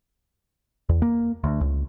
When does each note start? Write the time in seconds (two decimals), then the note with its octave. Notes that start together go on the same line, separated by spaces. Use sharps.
0.89 E2
1.02 A#3
1.44 D2
1.61 C#2